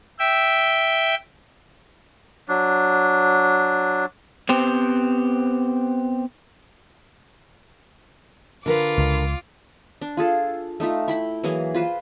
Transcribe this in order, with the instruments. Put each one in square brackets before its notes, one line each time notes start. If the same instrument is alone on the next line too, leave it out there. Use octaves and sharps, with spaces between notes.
[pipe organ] E5 G5
[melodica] F#3 D4
[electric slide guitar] B3 C4 G4 C5
[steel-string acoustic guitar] D3 A#4 B4 [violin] F4 D6
[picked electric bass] C#2
[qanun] D4
F4 G#4 A4
A3 D#4 F4 E5
E4 G5 B5
E3 F#3 A#3 G#4
F4 B4 C5